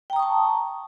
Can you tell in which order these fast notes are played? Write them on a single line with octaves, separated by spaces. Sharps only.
G5 A#5 D#6 C#6 A5